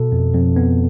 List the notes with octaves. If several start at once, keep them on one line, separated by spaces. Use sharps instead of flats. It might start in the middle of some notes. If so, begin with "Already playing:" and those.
Already playing: B2 A4
F2
F2
B3